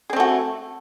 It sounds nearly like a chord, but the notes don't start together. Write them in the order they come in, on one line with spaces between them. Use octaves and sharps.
G#4 C4 A3 F#4